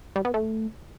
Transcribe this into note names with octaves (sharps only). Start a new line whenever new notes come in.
G3
B3
A3